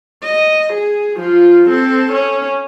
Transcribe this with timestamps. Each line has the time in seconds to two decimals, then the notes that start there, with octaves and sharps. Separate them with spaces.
0.23 D#5
0.73 G#4
1.17 F3 F4
1.69 C4 A4
2.12 C#4